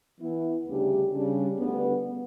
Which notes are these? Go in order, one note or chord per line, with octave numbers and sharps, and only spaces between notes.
E3 B3 E4
D2 C#3 G3 D4 G4
C#3 G3 D4
D2 D3 G3 B3